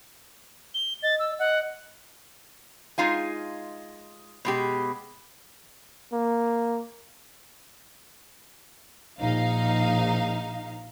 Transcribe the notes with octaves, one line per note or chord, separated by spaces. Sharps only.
G7
D#5 A6
E6
D#5 F#5
G#3 D#4 F4 F5 G#5
B2 G#3 G4
A#3
A#1 D#4 F5